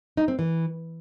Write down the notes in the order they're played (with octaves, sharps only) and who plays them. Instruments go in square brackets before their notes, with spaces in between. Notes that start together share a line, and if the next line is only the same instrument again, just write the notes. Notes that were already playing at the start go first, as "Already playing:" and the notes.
[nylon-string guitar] D#4
C4
E3